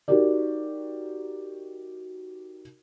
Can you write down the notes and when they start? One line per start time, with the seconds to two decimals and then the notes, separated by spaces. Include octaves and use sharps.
0.08 D#4 F#4 G4 A#4 D5